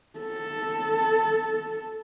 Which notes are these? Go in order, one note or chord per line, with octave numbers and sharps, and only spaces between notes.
A4